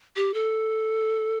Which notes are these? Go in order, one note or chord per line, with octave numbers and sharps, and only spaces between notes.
G4
A4